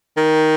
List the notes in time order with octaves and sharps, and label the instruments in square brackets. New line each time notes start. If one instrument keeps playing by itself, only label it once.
[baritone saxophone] D#3